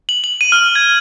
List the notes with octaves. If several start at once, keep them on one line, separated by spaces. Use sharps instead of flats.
F#7
F#7
D#7
F6
G#6